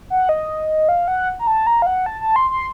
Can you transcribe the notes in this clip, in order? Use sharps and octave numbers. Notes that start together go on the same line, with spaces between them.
F#5
D#5
F5
F#5
A#5
A5
A#5
F5
F#5
A5
A5
C6
C6